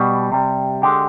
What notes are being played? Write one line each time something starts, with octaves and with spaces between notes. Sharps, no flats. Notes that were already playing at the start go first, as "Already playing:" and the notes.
Already playing: B2 G3
C3 G3
D3 G#3 G4